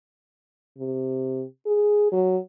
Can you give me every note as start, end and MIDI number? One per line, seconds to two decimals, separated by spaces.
0.78 1.44 48
1.66 2.11 68
2.12 2.37 54